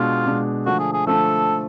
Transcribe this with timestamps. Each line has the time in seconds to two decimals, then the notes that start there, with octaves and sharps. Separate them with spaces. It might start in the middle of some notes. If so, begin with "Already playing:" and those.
Already playing: B2 G#3 D4 F4
0.26 B2 G#3 D4
0.66 D3 F3 A3 F#4
0.79 G#4
0.93 G#4
1.07 D3 F3 A3 A4